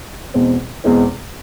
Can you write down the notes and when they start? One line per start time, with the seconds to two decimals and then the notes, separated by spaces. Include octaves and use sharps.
0.34 E2 B2 G#3 C4
0.84 E2 B2 G#3 C4